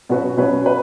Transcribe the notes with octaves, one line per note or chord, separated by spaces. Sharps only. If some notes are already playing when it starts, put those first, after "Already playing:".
B2 F#3 C#4 F#4 B4
B2 F#3 C#4 F#4 B4
B4